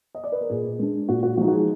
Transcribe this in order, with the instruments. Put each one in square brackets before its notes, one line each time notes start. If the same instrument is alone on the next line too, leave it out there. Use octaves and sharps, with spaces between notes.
[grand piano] D#5
D5
B4
A#4
A#2 G#4
G#3 D4
A#2 F#4
F#4
F3 G#3 D#4 F#4
F#4
G#4